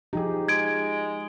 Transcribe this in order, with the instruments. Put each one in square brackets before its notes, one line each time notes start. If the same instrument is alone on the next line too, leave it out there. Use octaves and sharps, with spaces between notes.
[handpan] F3 G4 [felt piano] D#4 G#4
[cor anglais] G#3 [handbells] G#6 D7